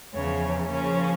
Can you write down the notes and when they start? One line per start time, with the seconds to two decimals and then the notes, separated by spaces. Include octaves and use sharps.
0.13 E2 C#3 F3 C#5
0.70 C#3 F3 A#3 C#4 C#5